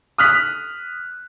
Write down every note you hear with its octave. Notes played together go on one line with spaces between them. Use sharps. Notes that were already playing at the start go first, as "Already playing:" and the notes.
D#6 F6 F#6 B6